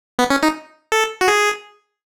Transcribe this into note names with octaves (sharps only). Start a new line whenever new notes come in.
B3
C#4
D#4
A4
F#4
G#4